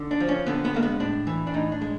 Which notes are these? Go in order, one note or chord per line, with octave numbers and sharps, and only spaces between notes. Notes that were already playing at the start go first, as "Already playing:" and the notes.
Already playing: D3
D4
F3
C#4
D3 B3
B3
G#3 A#3
B3
A2 D4
E3
D4
A2 D#4
D4
G#3